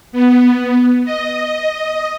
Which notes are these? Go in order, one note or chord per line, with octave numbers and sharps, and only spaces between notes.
B3
D#5